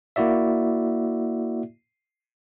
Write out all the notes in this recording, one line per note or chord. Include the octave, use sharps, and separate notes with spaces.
A#3 E4 F#4 D5 E5